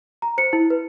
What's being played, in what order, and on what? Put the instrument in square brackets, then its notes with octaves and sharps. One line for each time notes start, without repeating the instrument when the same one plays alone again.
[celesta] A#5
C5 C#7
E4
B4